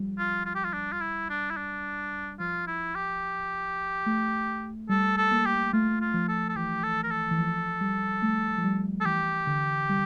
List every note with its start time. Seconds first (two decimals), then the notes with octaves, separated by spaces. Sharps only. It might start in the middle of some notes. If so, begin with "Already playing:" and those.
Already playing: F3 G3
0.18 F4
0.46 F4
0.55 G4
0.64 F4
0.73 D4
0.92 F4
1.01 E4
1.30 D4
1.50 E4
1.57 D4
2.39 F3 F4
2.67 E4
2.95 G4
4.06 A3
4.89 G3 A4
5.17 A4
5.31 A#3
5.45 G4
5.73 A3 F4
6.01 F4
6.14 F3
6.28 A4
6.49 A4
6.56 E3 G4
6.83 A4
7.03 A#4
7.11 A4
7.31 E3
7.39 F3
7.81 G3
8.22 A3
8.58 F3
8.64 G3
9.01 A4
9.05 E3 G4
9.47 D3
9.89 G3